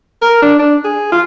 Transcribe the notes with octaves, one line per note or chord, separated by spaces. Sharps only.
A#4
D4
D4
G#4
F4